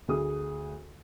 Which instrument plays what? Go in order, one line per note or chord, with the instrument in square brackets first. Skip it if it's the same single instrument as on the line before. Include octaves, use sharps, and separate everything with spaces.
[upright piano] D2 G#4 D#6